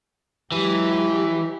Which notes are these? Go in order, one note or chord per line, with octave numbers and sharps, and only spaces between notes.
E3 F#3 G#3 G4